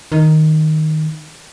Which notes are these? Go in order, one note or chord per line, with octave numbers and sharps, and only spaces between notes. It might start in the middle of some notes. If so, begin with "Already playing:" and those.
D#3